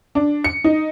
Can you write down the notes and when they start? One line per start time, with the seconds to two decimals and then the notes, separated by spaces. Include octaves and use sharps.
0.15 D4
0.44 C#7
0.64 D#4